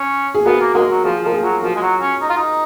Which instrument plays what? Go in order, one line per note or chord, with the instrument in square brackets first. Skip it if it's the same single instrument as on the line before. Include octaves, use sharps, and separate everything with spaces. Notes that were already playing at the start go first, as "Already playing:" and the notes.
Already playing: [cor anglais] C#4
[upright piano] G#4
[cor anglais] B3 [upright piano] F#4 A#4
[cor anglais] A#3
[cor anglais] G#3 [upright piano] F#4 A#4
[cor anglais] F#3
[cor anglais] F3 [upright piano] F4 G#4
[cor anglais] F3 [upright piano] A#4
[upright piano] F4 G#4
[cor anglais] F#3
[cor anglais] F3 [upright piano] F#4 A#4
[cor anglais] G#3
F#3
C#4
D#4
F4
D#4